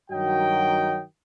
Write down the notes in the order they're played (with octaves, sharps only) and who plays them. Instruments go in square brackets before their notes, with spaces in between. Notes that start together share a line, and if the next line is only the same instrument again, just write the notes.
[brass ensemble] G2 D#3 F#3 F#4 D#5 G5